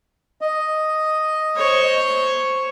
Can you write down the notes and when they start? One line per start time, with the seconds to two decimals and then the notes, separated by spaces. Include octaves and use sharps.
0.41 D#5
1.57 C5 C#5